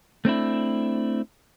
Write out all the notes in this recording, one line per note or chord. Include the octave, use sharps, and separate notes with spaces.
A3 C4 D4 E4